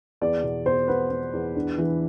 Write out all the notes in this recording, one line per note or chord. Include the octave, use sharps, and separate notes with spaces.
E2 D5
B2
B2 C5
B3 B4
B3
E2
D4
E3